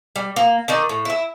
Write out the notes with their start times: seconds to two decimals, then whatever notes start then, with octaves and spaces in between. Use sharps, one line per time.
0.16 G3
0.36 A#3
0.68 D#3 D#4 D5
0.89 A2
1.05 E4 E5